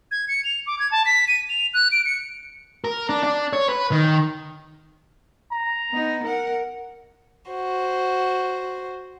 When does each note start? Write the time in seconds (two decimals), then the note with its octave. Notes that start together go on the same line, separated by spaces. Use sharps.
0.11 G#6
0.28 C#7
0.44 F7
0.67 D6
0.79 G#6
0.91 A5
1.06 B6
1.28 D#7
1.49 F7
1.74 F#6
1.92 D7
2.06 C#7
2.84 A#4
3.09 D4
3.23 D4
3.53 C#5
3.69 B4
3.92 D#3
5.52 A#5
5.92 B3 D#4
6.24 A#4 F#5
7.50 F#4 C5